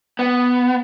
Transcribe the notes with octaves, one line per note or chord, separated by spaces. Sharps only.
B3